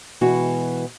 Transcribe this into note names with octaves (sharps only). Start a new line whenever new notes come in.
B2 E3 G#3 F#4